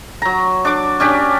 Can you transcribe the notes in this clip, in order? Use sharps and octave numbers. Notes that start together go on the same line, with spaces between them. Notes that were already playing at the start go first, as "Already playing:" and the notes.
F#3 A#5
D4 C#6 D6
C#4 D4 G4 D5